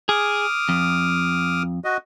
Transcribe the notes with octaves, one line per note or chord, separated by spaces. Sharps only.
G#4 D6 D#6 F6
F2
F#4 D#5